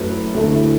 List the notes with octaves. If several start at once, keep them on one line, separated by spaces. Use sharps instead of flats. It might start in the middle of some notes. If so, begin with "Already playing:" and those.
Already playing: F#2 F#3 A3 E4 B4
D2 D3 A3 E4